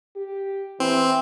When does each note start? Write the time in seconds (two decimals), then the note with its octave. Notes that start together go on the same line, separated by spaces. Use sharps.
0.16 G4
0.80 E3 C4